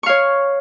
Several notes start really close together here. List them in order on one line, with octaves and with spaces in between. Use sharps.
C#6 F5 C#5